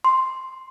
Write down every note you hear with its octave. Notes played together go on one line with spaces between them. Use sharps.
C6